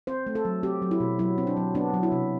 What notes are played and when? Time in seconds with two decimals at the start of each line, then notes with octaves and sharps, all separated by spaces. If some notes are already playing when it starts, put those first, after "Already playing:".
0.07 C4 C5
0.27 A3
0.35 A4
0.45 F#3
0.63 C4 G4
0.82 F#3
0.91 E4
1.00 B2
1.19 F#3 E4
1.38 C4
1.47 D4
1.57 F#3
1.75 B3 D4
1.94 F#3
2.03 E4
2.12 C3